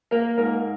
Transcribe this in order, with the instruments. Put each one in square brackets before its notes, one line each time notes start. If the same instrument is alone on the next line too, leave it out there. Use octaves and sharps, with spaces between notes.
[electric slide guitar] A#3 [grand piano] A#4
[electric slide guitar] G#2 [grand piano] A#4